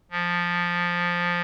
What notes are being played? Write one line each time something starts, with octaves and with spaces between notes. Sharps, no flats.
F3